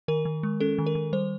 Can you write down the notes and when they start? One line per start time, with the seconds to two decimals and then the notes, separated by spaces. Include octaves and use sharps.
0.08 D#3 A#4
0.25 D#3
0.43 G#3
0.60 C#4 A4
0.78 D#3
0.86 A#4
0.95 D#3
1.13 G3 C5